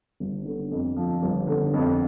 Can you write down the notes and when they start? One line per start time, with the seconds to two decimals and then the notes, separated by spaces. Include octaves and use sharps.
0.20 G1
0.45 D3
0.71 F2
0.96 F3
1.23 G1
1.47 D3
1.74 F2